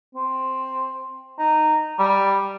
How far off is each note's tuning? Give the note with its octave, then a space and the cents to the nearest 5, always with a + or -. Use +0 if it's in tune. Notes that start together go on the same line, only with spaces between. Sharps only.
C4 +5
D#4 -15
G3 +0